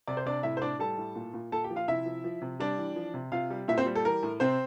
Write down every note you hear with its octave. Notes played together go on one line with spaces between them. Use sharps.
C3 D5
C5
C3 D4 D5
A2 E4 E5
C5
A2 D4 D5
G3 A4 A5
A2
A#2
A#2
A#2 A4 A5
G4 G5
F3
F4 F5
C3 E4 E5
F3
F3
C3
G3 D4 D5
E3
F3
C3
C3 F4 F5
G3
A#2 E4 E5
C4 C5
G3
A4
E3 A#4
A2
C3 C4 C5